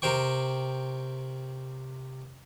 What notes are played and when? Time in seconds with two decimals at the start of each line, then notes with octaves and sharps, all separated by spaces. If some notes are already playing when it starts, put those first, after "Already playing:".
0.02 C3 A#4 C5 G5 C#6